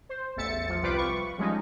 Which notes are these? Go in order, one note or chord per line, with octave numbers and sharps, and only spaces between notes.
C5
A1 E2 E5 A6 C#7
F3
C2 G3 F4 B4 B5 D6
C#6
F3 G3 G#3 C#4 D#4